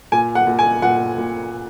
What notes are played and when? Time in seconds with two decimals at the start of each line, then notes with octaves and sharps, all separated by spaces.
0.12 A#2 G#5
0.35 F#5
0.47 A#2
0.59 G#5
0.82 A#2 F#5
1.18 A#2